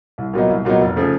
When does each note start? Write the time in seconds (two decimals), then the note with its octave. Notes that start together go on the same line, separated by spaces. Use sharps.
0.18 C2
0.33 A#2 F#3 B3 D#4
0.49 C2
0.65 A#2 F#3 B3 D#4
0.81 F1
0.96 C#3 F3 A3